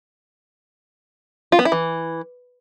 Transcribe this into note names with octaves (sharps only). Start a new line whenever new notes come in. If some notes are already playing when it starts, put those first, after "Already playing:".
F4
B3
E4
E3